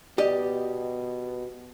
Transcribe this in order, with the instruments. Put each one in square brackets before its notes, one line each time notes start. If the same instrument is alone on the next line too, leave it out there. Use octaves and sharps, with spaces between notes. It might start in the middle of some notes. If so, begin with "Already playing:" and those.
[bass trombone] B2 [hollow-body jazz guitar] G4 D5 D#5